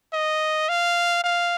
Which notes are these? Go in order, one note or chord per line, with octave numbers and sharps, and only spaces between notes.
D#5
F5
F5